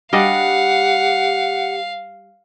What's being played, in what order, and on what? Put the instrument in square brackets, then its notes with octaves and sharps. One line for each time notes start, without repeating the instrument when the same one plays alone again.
[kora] G3 D4 D#5 [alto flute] G4 [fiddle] F5 [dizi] F#5